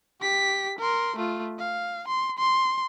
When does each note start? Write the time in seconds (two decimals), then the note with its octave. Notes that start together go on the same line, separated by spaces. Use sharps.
0.21 G4 B6
0.79 A#4 C6
1.17 A3 F4
1.59 F5
2.08 C6
2.39 C6